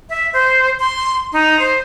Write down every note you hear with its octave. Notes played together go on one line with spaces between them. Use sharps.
E5
C5
C6
D#4
C5